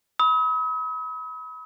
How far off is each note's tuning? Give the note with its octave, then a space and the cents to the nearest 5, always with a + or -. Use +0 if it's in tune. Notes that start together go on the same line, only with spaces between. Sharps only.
B5 +0 D#6 +45